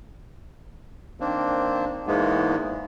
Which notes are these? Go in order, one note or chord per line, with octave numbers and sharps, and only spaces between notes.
D#3 A#3 C4 D4
E2 G#2 E3 G#3 A#3 B3